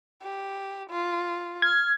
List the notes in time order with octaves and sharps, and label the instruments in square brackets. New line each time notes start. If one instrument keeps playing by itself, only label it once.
[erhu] G4
F4
[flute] F6 [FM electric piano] G#6